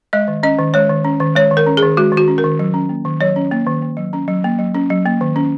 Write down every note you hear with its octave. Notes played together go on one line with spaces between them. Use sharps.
G#3 D#5
D#3
C#4 D#5
D#3
G#3 C#5
D#3
C#4
D#3
G#3 C#5
D#3
A#4
C#4
G#4
D#3
G#3 F#4
D#3
F#4
C#4
A#4
D#3
F#3
C#4
A#3
D#3
F#3 C#5
C#4
A#3
D#3
A#3
F#3
C#4
F#3
A#3
F#3
C#4
F#3
A#3
D#3
C#4